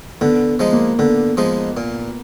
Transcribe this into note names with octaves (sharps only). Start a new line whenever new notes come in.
D3 B3
F3 G#3 D#4
A#3
D3 B3
F3 G#3 D#4
A#2